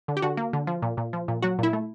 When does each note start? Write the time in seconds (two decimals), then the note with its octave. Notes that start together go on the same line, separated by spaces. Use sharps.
0.08 D3
0.17 G4
0.22 D3 F#4
0.37 A#3
0.53 D3
0.67 F3
0.82 A#2
0.97 A#2
1.13 F3
1.28 A#2
1.42 F#3 F#4
1.59 A#2 E4
1.73 A3